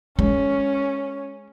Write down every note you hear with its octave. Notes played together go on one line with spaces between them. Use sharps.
G#3 C#4